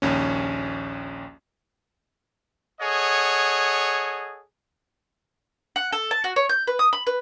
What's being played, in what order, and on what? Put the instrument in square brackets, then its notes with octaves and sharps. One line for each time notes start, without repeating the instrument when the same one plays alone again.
[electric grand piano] A#1 D#2 C#4
[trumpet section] G#4 A4 C#5 D#5 F#5
[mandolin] F#5
A4
A5
F#4
C#5
G6
B4
D#6
B5
B4